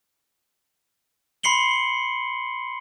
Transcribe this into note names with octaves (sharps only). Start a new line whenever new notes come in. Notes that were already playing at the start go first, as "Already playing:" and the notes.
B5 C6 C7 C#7 F#7 G7